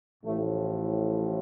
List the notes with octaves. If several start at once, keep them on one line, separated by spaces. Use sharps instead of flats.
A1 A2 F3 A3